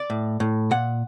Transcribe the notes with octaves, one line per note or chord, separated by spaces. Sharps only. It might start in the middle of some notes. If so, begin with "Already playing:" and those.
Already playing: D5
A2
A2
A#2 F#5